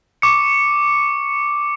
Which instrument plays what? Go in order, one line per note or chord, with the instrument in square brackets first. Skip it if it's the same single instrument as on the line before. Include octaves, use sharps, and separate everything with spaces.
[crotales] C#6 D6 C#7